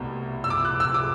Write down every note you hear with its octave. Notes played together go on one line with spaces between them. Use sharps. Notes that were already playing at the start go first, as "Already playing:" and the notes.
Already playing: C2 B2 A3
E6
D6
F#6
E6
D6